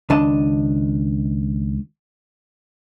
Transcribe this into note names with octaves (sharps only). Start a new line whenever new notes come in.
C#2 D#3 D4 D#5 A5